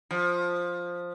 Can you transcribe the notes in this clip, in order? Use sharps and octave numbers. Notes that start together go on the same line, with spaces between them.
F3